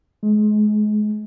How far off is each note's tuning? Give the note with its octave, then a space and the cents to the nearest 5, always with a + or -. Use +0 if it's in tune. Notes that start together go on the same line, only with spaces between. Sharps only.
G#3 +30